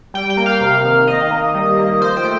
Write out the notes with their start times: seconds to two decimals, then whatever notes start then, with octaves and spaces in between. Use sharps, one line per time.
0.14 G3 G5
0.30 G5
0.37 A#3
0.46 F5
0.61 C3
0.85 D#3
1.07 D#3 D#5
1.31 A#3
1.54 G3
1.77 A#3
2.00 F3 C5
2.17 G5
2.24 A3